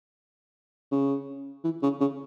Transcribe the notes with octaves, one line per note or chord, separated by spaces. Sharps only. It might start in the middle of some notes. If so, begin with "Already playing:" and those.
C#3
E3
C#3
C#3